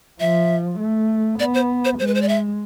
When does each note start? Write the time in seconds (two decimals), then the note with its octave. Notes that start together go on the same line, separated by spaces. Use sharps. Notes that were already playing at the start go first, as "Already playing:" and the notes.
0.20 F3 E5
0.80 A3
1.40 B3 D5
1.54 C5
1.85 C5
1.99 G#3 C5
2.07 B4
2.15 C5
2.22 D5
2.28 E5